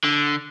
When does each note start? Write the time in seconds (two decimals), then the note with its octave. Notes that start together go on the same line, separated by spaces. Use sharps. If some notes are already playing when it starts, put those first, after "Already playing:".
0.05 D3